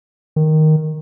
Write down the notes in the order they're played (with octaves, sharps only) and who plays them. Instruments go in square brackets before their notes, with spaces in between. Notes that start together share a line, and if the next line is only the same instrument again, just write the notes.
[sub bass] D#3